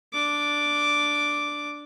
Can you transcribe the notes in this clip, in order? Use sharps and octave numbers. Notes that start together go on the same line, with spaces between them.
D4 D6